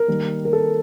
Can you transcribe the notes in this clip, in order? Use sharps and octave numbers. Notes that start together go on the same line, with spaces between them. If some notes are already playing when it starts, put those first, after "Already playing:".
Already playing: A#4
D#3 G3 A#3
A#4
A4